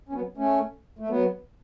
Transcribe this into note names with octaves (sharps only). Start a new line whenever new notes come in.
C#4
F#3 B3
A3 C#4
A3
F#3 B3